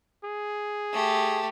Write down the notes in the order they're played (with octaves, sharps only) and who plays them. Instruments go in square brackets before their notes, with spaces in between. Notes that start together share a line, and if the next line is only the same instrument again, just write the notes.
[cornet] G#4
[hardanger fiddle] A3 G4